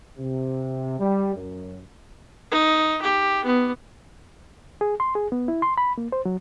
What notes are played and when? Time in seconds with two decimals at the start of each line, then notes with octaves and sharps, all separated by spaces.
0.18 C3
0.99 G3
1.35 F#2
2.51 D#4
3.02 G4
3.44 B3
4.81 G#4
5.00 C6
5.15 G#4
5.32 B3
5.48 E4
5.62 C6
5.78 B5
5.98 A#3
6.12 C5
6.25 F#3